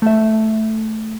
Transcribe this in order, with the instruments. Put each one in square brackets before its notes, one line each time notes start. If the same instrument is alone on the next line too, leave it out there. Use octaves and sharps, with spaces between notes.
[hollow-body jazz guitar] A3 E5